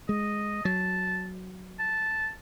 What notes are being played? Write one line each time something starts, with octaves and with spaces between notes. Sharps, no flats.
G#3 D#5
F#3 A5
A5